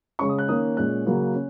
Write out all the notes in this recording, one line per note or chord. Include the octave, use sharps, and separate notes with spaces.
C#3 G#3 C#4 C#6
D#6
F#6
D#3 A#3 C#4 D#6
A#2 G#3 C#4 F#6
C#3 F#3 A#3 C#4
C#4